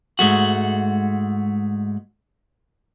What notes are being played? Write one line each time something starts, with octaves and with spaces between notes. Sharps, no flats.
G#2 G#3 A3 F#4